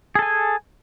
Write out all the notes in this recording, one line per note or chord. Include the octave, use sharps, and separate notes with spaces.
G#4 A4 G#5